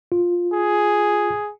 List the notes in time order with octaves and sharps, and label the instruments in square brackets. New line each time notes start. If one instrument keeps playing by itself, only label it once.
[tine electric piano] F4
[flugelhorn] G#4